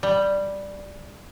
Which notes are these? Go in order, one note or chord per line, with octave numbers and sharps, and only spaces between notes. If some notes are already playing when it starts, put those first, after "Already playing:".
G3